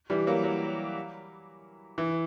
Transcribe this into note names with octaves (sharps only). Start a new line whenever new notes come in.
E3 G3
F#3 A#3
F#3
E3